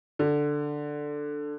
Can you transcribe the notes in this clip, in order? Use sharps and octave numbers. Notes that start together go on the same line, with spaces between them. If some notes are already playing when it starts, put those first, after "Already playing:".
D3